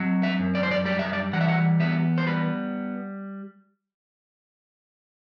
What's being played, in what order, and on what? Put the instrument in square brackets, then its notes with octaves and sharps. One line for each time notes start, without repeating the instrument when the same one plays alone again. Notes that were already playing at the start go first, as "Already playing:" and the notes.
Already playing: [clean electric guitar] F#3 C4
E5
F#2
D5
C5
D5
G3 D5
E5
D5
E3 F#5
E5
F#5
B3 E5
C5
G3 B4